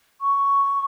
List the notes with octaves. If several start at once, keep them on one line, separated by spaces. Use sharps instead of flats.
C#6